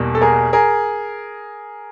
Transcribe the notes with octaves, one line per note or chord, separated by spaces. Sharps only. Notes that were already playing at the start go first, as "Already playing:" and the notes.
Already playing: E2 B2 G3 A#3
A4
G#4 A#4
G#4 A#4